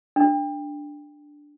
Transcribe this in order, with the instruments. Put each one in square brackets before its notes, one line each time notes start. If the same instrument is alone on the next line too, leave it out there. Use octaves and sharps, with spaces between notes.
[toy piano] D4